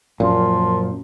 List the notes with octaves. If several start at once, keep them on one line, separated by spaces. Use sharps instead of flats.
F#2 A#2 F3